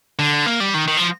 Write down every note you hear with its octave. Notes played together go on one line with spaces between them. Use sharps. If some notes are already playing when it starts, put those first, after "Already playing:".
D3
A#3
G3
D#3
D#3
F3